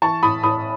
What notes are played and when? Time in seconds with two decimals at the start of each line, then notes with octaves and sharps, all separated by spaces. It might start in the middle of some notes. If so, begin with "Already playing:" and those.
0.02 E3 A5 C#6
0.23 A2 B5 D#6
0.43 A2 B5 D#6